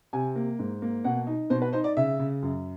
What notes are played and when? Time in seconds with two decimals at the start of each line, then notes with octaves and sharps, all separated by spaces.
0.13 C3 G#5
0.36 A#3
0.59 G#2
0.82 A#3
1.04 B2 F#5
1.27 D#4
1.50 B2 C5
1.62 B4
1.73 D#4 C5
1.84 D5
1.97 C#3 E5
2.19 C#3
2.43 F#2